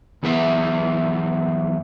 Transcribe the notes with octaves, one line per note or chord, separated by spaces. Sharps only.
F#2 E3 B3 G#4 E5